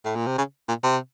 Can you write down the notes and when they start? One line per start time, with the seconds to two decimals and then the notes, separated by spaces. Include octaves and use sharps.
0.05 A2
0.15 A#2
0.27 C3
0.38 C#3
0.68 A#2
0.83 C3